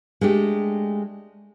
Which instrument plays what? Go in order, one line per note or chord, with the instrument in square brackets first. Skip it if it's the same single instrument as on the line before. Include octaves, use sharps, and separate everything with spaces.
[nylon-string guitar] G#3 A3 D4 G4